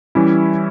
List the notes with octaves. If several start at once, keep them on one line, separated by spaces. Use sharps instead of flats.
E3 G3 C#4 E4